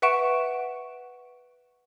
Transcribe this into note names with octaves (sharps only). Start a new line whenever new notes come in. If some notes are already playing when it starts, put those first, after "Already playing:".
B4 E5 F#5 C#6 D7 E7